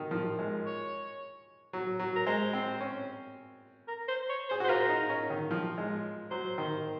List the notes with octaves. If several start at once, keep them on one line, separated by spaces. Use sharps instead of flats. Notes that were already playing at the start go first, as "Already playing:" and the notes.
Already playing: D#3 F#3
F3
G#3
C#5
F#3
F#3
A#4
G#3 C5
C4
C#4
A#4
C5
C#5
G#4 C5
F#4
C5
F4 A#4
D#4
C#4
D#3
F3
G#3
F#3 C5
D#3